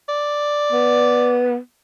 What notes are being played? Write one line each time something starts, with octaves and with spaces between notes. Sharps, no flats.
D5
B3